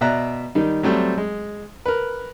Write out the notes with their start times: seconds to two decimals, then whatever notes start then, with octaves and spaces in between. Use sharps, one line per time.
0.01 B2 D5 E5 A#5 F#6
0.55 D#3 G3 D#4
0.83 F#3 G3 A3 C4
1.18 G#3
1.86 A#4 B4